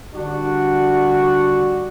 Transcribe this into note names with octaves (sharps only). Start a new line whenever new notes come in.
D3 G3 D4 F#4